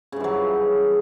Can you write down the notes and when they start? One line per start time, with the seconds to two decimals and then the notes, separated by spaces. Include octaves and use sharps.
0.12 C#3
0.16 G2
0.20 E3
0.24 F#3